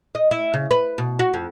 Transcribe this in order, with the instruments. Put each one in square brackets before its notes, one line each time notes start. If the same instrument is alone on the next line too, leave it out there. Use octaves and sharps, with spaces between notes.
[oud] D#5
E4
C#3
B4
B2
F#4
F2